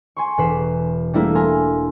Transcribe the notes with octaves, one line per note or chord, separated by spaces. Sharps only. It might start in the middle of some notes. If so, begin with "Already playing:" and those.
G#5 C6 C#6
E1 E3 B4 C7 E7
G3 A3 A#3 D4 E4
A#4 G#5 C6